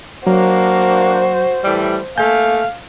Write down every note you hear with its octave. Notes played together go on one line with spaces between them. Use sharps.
F#3 A#3 D4 F#4 C5
A2 E3 G3
A3 A#3 F5 G#5 G6